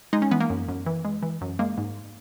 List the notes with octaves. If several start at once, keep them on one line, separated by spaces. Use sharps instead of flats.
G#3 D#4
C#4
E3 B3
A#3
F#2
F#2
E3
G#3
E3
F#2
G#3 A#3
G#2